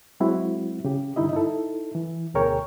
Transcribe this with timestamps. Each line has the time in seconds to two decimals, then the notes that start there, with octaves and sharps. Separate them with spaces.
0.20 F#3 G#3 C4 E4 F#4
0.85 C#3 G4
1.16 G2 D3 D#4 E4 D#5
1.33 D#4 E4 A4
1.95 E3
2.34 D2 B2 G#4 A#4 C#5 G5